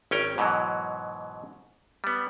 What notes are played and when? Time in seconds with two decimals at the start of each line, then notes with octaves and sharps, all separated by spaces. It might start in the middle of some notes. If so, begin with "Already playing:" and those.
0.11 G#1 C#4 G5 A#5
0.38 G#2 B2 E3 F#3
2.04 G3 B3